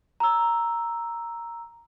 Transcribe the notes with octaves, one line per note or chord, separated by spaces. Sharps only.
A#5 E6